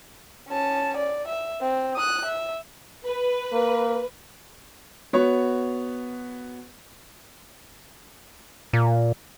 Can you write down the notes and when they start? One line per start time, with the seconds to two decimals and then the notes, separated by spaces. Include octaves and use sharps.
0.49 C#4 A5
0.97 D5
1.28 E5
1.61 C4
1.96 D#6 F#6
2.26 E5
3.05 B4
3.53 A#3
5.13 B3 F#4 C#5
8.73 A#2